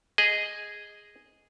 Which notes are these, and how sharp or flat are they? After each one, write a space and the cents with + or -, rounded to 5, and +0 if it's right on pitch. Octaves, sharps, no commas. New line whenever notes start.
G#4 -5 D#5 +0